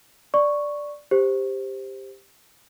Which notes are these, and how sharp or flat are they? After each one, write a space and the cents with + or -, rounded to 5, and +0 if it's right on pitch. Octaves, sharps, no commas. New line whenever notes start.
D5 +0 C#6 +0
G4 +10 C5 +0